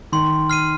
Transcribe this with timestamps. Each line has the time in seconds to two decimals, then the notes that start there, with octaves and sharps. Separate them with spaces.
0.12 D#3 C6
0.50 F6 C7 D#7